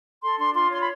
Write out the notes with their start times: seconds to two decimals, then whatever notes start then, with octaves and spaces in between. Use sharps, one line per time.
0.22 A4 C6
0.38 D4 C6
0.54 F4 C6
0.71 C#5 C6
0.80 B5